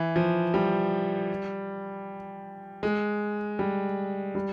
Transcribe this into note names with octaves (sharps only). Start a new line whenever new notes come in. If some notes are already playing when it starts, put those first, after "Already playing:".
Already playing: E3
F3
G3
G#3
G3
G3